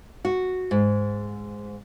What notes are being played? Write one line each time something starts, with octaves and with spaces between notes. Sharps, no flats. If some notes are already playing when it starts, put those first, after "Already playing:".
F#4
G#2